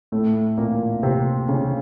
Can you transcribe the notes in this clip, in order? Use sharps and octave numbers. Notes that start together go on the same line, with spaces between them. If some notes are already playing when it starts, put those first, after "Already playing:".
A2 A3
A#2 A#3
C3 C4
C#3 C#4